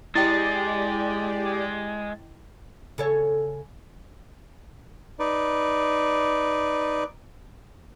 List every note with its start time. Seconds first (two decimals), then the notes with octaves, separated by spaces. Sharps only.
0.15 G#3 E4 G4 D5 D#5 G5 A6
2.98 C#3 A4 C#5
5.19 D#4 B4 D5